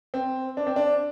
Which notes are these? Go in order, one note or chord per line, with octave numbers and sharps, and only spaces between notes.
C4
D4
C4
D4